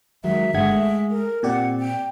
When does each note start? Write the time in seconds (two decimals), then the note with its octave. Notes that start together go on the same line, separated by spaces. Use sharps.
0.24 D#3 F#3 G#3 E5
0.54 G#1 D3 G#3 E5 F#5 G#6
0.71 A3
1.10 A#4
1.43 A#2 C4 G4 D5 F#5
1.79 G5